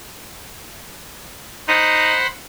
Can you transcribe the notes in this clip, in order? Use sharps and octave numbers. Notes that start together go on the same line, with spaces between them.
D#4 C5 F#5 B5